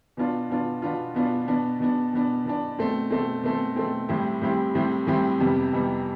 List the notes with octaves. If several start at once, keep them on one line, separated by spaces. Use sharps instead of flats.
B2 B3 D4 F4
B2 B3 D4 F4
B2 B3 D4 F4
B2 B3 D4 F4
B2 B3 D4
B2 B3 D4
B2 B3 D4
B2 B3 D4
B2 A3 C4
B2 A3 C4
B2 A3 C4
B2 A3 C4
A2 G3 C4 E4 G4
A2 G3 C4 E4 G4
A2 G3 C4 E4 G4
A2 G3 C4 E4 G4
F2 C3 G3 B3
F2 C3 G3 B3